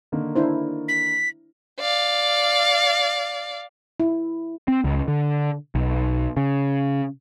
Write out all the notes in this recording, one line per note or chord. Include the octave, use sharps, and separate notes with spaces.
D3 D#3 A#3
D4 E4 C5
B6
D5 F5
E4
C4
C#2
D3
B1
C#3